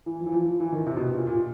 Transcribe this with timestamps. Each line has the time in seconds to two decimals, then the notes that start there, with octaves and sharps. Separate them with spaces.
0.06 E3
0.20 F3
0.26 E3
0.32 F3
0.46 F3
0.60 E3
0.72 D#3
0.87 C3
0.97 B2
1.16 A#2
1.27 A#2